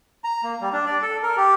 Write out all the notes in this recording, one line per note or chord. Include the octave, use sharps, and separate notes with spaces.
A#5
A#3
G3
D4
D5
A4
A#4
G4